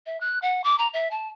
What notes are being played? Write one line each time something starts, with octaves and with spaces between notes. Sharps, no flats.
E5
F#6
F#5
D6
A#5
E5
A5